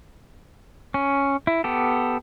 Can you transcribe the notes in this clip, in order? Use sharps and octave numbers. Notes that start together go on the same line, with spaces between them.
C#4
E4
B3 G4 A4